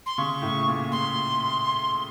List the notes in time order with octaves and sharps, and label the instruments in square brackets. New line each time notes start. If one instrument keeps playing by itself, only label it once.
[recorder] C6
[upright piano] C#3 [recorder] C#6
[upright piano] A2
A#2
[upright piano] A#2 [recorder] C6